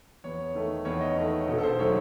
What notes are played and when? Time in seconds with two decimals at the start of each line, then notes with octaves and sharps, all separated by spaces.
0.24 E2 C#5
0.55 D#3 A3
0.85 E2 C#5
1.01 D#5
1.16 D#3 A3 C#5
1.47 E1 A4
1.58 A4
1.63 C5
1.79 D#3 F#3 A3 C#5